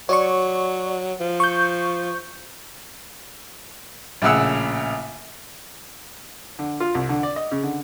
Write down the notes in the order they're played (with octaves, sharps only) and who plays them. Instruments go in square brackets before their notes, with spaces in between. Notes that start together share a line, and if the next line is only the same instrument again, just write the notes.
[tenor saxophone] F#3 [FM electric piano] C#5 D5 C#6
[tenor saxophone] F3
[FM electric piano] C#6 G6
[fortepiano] A#1 A2 C#3 F#5 E6
D3
F4
C2
D3
D5
D#5
C#3
D3